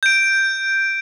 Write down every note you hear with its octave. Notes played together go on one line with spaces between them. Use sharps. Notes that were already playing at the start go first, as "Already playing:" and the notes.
G6 D7